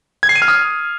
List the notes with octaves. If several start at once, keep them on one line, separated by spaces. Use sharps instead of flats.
G#6
C7
D#7
F6
D#6